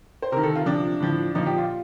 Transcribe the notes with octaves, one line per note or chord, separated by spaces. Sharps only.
C5
C3 D#3 A#4
A4
F4
C3 F3 D4
A2 F3
A#2 F3 D#4
G4
F4